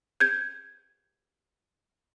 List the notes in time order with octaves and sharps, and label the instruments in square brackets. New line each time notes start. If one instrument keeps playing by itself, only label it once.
[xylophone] G6 G#6